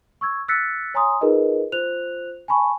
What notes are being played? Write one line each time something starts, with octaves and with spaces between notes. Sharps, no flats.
C#6 E6 G#6
E6 F#6 A6 B6 C#7
C#5 G#5 A#5 C6 D#6
D#4 F4 G#4 A#4 B4 D#5
F4 C5 F#6 F7
G#5 A5 B5 C#6